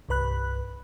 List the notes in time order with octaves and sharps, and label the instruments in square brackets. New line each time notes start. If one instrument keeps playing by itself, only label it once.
[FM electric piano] C2 G2 B4 B5 F#6